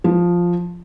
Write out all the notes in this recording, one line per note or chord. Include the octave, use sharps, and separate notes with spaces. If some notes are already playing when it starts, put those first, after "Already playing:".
F3